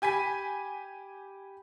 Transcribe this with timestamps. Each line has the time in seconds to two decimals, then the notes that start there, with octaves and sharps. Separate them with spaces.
0.02 G4 G#5 B5 B6